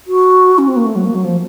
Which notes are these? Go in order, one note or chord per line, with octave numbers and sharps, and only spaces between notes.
F#4
C#4
C4
A#3
A3
F#3
A#3
F#3
F3